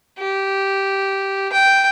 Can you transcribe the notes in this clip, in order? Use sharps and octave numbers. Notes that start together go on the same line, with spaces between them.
G4
G5